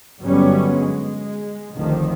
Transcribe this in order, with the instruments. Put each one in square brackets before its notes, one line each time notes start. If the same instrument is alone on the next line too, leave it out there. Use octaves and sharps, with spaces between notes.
[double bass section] G1 G2 F#3 G3 B3 C#4
G#3
F1 D2 D#3 F3